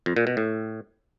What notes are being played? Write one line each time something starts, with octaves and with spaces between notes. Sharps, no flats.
F2
A#2
B2
A2